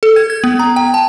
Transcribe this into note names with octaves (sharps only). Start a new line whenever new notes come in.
A4
G#6
G#6
B3
A#5
G5
A5